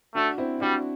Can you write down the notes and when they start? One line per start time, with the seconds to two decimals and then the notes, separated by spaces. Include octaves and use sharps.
0.15 A3 D4 F#4
0.38 C4 E4
0.60 G3 D4 F#4